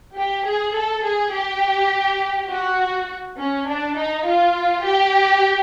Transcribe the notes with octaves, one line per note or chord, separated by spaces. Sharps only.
G4
G#4
A4
G#4
G4
F#4
C#4
D4
D#4
F4
G4